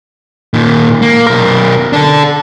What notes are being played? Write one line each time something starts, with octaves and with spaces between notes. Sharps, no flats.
A#2 D#3
A#3
B1 A#4
D4 A4